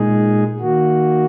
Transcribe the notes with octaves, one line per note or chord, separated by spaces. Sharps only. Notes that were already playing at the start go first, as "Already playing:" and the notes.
Already playing: A#2 G#3 D#4 G#4
D#3 A#3 F#4